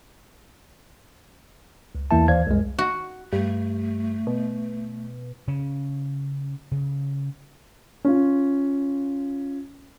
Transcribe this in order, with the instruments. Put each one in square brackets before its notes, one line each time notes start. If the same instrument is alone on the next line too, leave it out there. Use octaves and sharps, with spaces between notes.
[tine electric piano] C#2
E2 E3 A#3 E4 E5 A5
D#2 E3 C5 D5 F5 G#6
C2 F#2 G#3
[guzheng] F#4
[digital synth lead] G2 [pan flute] A3
[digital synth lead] B2
[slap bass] C#3 C#4
C#3
[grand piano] C#4 F4